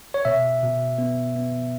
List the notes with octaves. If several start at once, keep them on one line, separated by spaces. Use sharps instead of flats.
C#5
B2 E5
B2
B3
B3